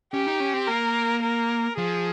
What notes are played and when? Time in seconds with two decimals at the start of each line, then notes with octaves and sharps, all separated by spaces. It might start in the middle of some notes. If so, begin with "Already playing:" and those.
0.13 C#4 G4
0.27 D#4
0.40 C#4
0.53 C4
0.67 A#3 A#4
1.23 A#4
1.77 F3 G#4